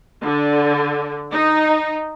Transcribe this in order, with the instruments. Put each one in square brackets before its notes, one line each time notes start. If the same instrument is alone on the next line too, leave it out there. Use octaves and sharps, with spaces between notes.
[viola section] D3
D#4